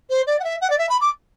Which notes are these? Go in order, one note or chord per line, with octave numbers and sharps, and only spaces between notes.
C5
D5
F#5
E5
F#5
D5
E5
B5
D6